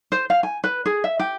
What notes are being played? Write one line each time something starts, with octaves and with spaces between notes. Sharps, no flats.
C5
F5
G#5
B4
G#4
E5
G4